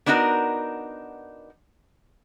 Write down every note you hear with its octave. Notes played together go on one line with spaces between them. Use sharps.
B3 D4 D#4 F#4 A#4